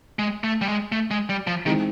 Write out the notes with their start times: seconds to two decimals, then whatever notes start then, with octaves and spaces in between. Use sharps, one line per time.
0.19 G#3
0.44 A3
0.61 G3
0.68 G#3
0.92 A3
1.11 G#3
1.29 G3
1.47 F3
1.66 D#3 E3 G#3 C4 D#4